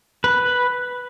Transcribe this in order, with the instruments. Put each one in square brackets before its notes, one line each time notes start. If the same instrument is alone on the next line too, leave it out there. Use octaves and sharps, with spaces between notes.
[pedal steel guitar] B4